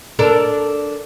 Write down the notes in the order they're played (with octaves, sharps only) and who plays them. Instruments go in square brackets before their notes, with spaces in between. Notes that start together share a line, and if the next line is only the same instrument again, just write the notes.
[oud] D4 A4 A#4